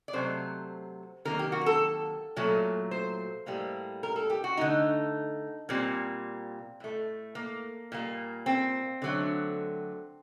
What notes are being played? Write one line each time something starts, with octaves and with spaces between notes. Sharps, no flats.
D5
C3 F#3 A3 C5
C3 D#3 F#3 A#3 A#4
G4
F#4
A#4
A4
A#2 F#3 A3
C5
A2 G3 A#3
A#4
A4
G4
F#4
D3 A3 D#4
A#2 G3 A#3 C4
A2 A3
A#3
A#2 G3 A#3
C4
D3 F#3 A3